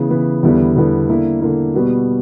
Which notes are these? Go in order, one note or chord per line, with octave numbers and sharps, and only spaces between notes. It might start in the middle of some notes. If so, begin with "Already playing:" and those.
Already playing: C#3 E3 B3
C#3 E3 B3
E2 D3 G3 B3 E4
E2 D3 G3 B3 E4
D3 A#3 E4
D3 A#3 E4
B2 G3 B3 F#4